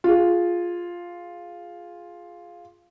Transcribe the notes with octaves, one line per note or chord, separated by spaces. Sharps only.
F4 G#4